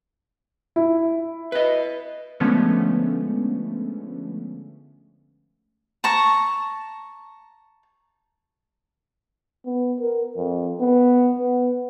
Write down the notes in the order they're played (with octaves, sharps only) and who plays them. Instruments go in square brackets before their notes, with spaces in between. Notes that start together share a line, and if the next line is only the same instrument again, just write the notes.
[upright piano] E4
[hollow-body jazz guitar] B4 D#5
[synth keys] D3 F3 G#3 A3 B3 C#4
[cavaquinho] A5 A#5 C#6
[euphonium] B3
A#4
F2
B3
B3